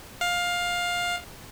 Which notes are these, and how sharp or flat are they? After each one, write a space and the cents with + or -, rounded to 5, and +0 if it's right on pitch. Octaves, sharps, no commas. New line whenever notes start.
F5 +15